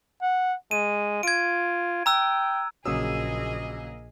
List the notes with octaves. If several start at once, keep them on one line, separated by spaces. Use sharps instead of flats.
F#5
G#3 D#7
F4 G#6 D7
G5 A#5 E6 F#6
A#1 C#3 F#3 A#3 G#4 D#5 D#6 E6